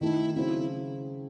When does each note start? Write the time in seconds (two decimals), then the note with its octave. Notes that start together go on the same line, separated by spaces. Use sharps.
0.01 D#3 A3 D#4 E4
0.35 C#3 F#3 C4 E4